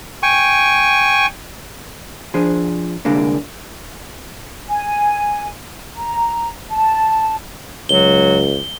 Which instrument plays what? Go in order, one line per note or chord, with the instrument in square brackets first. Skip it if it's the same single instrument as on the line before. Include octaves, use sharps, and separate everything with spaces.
[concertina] G5 G#5 C#6
[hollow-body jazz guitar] F3 D4 G#4 C5
C2 D3 G#3 A#3 D4
[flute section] G#5
A#5
A5
[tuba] C#2 [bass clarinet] F#3 [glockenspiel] G7